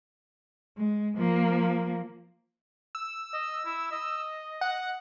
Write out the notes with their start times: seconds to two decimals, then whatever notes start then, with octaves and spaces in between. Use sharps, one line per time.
0.77 G#3
1.17 F3 A#3
2.95 E6
3.33 D#5
3.66 E4
3.92 D#5
4.61 F#5